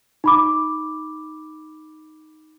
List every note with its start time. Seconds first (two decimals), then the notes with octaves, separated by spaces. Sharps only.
0.24 D#4 B5 D6